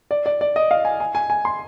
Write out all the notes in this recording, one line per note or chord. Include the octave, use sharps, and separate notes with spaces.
D5
D5
D5
D#5
F5
G#5
G#5
G#5
G#5
C6